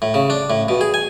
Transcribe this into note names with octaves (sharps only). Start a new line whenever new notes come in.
A2
C#3
D4
A2
B2
G#4
G#5